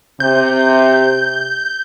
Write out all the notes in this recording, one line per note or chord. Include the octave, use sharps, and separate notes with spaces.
C3 G6